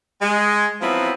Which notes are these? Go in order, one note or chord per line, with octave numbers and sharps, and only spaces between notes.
G#3
F3 F#3 B3 C4 E4